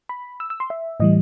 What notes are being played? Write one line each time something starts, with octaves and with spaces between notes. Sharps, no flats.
B5
E6
E6
C6
E5
A2 E3 G3 D#5